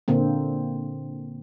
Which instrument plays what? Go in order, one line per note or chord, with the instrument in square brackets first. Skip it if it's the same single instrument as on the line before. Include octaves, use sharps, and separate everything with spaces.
[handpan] A#2 D3 A#3 C4